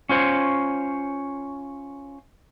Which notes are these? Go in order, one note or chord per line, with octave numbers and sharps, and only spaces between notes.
C#4 F4 C5 C#5